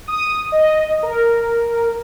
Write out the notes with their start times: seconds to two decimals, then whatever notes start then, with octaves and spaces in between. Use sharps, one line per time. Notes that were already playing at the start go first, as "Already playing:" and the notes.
0.07 D#6
0.52 D#5
1.03 A#4